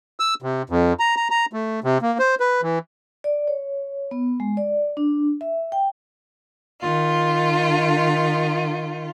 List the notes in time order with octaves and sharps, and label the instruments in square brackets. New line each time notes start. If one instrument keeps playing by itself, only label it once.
[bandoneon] E6
C3
F2
A#5
A#5
A#5
A3
C3
A#3
C5
B4
E3
[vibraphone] D5
C#5
B3
G#3
D5
D4
E5
G5
[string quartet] D#3 F4